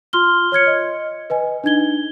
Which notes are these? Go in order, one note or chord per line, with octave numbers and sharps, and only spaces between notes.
F4 C6 F6 G7
C#5 F6 G#6 C#7
D#5
B4 D#5 G#5
D4 D#4 G#6 G7